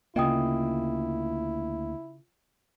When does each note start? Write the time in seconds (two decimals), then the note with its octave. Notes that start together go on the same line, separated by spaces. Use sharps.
0.16 D2 C#3 A#3 E4 F4 D#5 G5 D#6